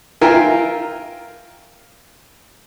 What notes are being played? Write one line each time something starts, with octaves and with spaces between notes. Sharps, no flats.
F4 A#4 E5 G5 G#5